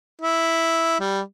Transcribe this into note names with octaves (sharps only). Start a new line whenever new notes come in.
E4
G3